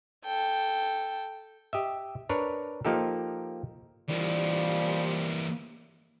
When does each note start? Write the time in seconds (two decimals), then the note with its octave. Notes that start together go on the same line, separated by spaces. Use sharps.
0.25 A4 G5
1.73 G4 D#5 E5
2.29 D4 A#4 B4 C#5
2.85 F3 A#3 D#4 G4 A4
4.09 E3 F3 G3 A#3